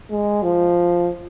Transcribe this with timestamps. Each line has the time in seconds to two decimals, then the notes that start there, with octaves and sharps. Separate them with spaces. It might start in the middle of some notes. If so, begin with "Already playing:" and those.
0.11 G#3
0.43 F3